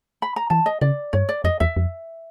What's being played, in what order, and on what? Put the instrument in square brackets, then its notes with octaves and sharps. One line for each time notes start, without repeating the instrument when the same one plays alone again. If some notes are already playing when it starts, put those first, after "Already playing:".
[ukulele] B5
A#5
[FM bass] E3 [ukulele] A5
[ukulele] D#5
[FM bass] C#3 [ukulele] D5
[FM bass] G2 [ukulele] C#5
[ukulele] D5
[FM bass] F2 [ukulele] D#5
[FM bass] E2 [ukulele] E5
[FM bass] F2